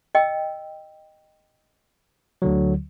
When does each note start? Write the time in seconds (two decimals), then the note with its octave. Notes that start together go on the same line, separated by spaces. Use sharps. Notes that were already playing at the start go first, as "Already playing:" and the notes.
0.15 D#5 G5 E6
2.42 D2 D3 F#3